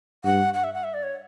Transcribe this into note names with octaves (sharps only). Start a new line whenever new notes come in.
G2 F#5
F#5
E5
F#5
E5
D5
C#5